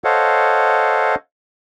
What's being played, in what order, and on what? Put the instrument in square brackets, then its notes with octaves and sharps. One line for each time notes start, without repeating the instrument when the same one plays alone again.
[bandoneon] A4 C5 C#5 D#5 F5 F#5